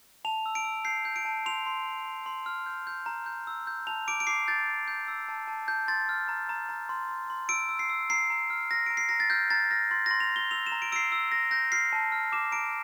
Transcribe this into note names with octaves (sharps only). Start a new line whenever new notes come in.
A5 F7
E6
D7
E6
G6 C7
G6
D7
A5
C6 F7
C6
C6
C6
C6
F6
G6
G6
A#5
G6
E6
G6
A5 F7
D6 D7
D7
D6 C7
G6 A6
G6
G6
E6
A5
A5
A5 G6
C6 A6
F6
A#5
A#5
A#5
C6
C6
C6
E6 D7
E6
C7
E6
A#5 C7
A#5
F6
F6 A#6
A#5 D7
C7
A#5 A#6
A6
F6 G6
A#5 A6
F6 A#6
C6 A6
C6 A#6
F7
C6
G7
E6 F7
E7
A#5
D7
E6 C7 D7
E6
E6 A#6
G6 A#6
F6 C7
A5
F6
D6 E7
A#5 D7